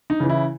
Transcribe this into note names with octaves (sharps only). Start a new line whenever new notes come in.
D#4
C#3 E3
E4